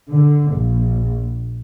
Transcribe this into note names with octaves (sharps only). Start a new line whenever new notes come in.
D3
A#1